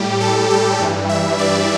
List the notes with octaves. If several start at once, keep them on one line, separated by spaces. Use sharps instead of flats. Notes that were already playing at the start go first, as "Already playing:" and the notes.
Already playing: A2 G3 G4
A4
G4
G2 E3 G3
E5
D5